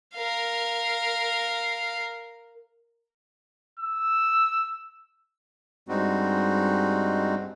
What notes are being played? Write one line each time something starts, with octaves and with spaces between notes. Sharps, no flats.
A#4 F5
E6
G2 G3 G#3 C4 D#4 F#4